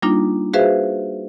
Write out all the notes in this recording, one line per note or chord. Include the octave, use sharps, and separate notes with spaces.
G3 A#3 D4 D#4 F4
F#4 G#4 B4 C5 E5 F5